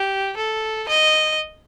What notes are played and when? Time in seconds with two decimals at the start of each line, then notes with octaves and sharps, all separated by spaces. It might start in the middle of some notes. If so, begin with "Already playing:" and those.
Already playing: G4
0.37 A4
0.89 D#5